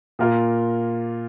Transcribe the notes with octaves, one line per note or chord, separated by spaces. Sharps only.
A#2 A#3 F4 A#4